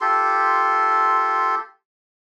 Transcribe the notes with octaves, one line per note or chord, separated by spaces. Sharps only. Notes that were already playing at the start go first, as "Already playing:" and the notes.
F4 G4 A4 C6